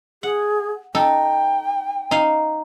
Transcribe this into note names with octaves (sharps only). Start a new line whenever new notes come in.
G#4 F#5
D#4 A4 G5
D#4 F5